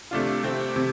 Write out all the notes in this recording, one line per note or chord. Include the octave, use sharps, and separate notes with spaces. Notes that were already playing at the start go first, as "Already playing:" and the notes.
C3 A3 D4 F4
C3 A3 C4
C3